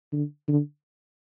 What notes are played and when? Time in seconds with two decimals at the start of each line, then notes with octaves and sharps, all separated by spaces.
0.13 D3
0.48 D3